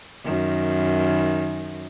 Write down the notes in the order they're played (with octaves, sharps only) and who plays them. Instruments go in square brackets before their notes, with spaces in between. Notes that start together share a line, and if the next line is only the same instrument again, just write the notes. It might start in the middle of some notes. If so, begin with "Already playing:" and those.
[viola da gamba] F#2 D#3